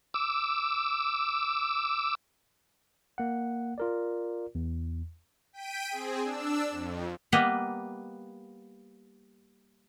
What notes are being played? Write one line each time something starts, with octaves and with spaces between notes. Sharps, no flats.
D6 E6
A#3 F#5
F4 A#4 D5
E2
G5 B6 D7 D#7
C4 G#4
D4 E6
F2
G3 A#3 B3 B4 D#5